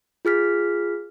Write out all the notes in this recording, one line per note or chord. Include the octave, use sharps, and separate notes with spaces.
F4 G#4 F6 B6